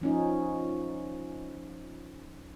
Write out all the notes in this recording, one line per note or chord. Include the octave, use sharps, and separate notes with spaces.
F3 C#4 D#4